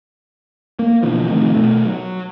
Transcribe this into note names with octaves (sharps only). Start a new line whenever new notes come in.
A#3
B2 D3 E3 F3
A2 C3 D#3 F3
B2 A3
F#3